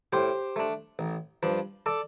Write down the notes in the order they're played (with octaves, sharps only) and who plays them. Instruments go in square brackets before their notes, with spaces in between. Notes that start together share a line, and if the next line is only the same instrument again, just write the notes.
[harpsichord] A2 G4 C5
A3 D4
A1
G2 F3 D4
A4 D5